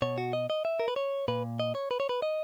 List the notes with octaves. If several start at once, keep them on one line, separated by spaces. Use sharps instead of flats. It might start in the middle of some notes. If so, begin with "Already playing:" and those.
B2 C#5
F#4
D#5
D#5
E5
A#4
B4
C#5
A#2 B4
D#5
C#5
B4
C#5
B4
D#5